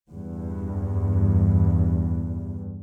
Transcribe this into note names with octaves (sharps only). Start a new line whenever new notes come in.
E2 G2